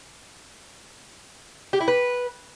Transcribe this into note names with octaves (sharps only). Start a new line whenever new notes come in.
G4
E4
B4